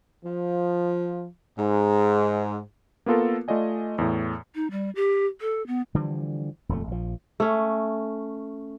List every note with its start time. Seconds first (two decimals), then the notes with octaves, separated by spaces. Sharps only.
0.24 F3
1.58 G#2
3.06 A#3 B3 F4 A4 A#4
3.48 A3 F4 D5 D#5 G#5
3.98 E2 A2
4.55 D#4
4.71 G3
4.95 G4
5.41 A4
5.67 B3
5.95 D3 E3 F3 G3
6.69 D#1 F2 E3 A3
6.88 A#1 F3
7.40 A3 C#4